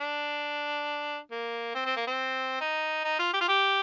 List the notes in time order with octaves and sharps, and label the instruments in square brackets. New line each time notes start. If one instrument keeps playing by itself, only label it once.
[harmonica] D4
A#3
C4
C4
A#3
C4
D#4
D#4
F4
G4
F4
G4